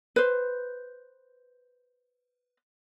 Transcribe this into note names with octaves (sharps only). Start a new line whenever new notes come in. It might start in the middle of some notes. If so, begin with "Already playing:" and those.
B4 C5